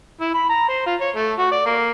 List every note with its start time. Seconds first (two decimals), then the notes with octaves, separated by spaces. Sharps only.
0.21 E4
0.34 B5
0.49 A#5
0.68 C5
0.86 F4
1.00 C#5
1.15 A3
1.39 F#4
1.51 D5
1.66 A#3